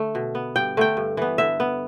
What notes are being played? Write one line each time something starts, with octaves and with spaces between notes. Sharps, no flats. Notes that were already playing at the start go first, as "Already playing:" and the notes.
Already playing: D3 A3
B2
B3
G2 G5
D3 A3 G5
G2
E3 B3
D3 E5
B3